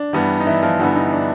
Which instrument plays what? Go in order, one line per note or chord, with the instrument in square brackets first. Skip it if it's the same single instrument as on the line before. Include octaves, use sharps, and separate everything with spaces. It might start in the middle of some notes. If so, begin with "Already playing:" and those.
Already playing: [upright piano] D4
G2 E3 G3 B3
D#4
E3 E4
F3 F4
G2 D3 E3 G3 B3 E4
D#4
D4